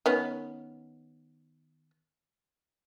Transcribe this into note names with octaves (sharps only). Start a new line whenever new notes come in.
D#3 B3 C#4